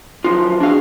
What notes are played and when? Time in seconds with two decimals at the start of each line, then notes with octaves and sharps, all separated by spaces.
0.24 D#3 F3 F#3 D#4 F4
0.60 D4 F#4 G#4 F5